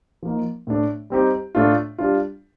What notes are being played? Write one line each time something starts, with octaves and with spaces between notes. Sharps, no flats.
F3 A#3 D#4
A2 A3 D4
G3 C4 D#4 G4
A2 A3 D4 F4
G3 D4 F4